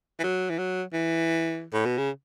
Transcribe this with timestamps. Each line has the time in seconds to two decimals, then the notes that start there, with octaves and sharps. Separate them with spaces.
0.19 E3
0.23 F#3
0.50 E3
0.58 F#3
0.93 E3
1.74 A2
1.86 B2
1.97 C#3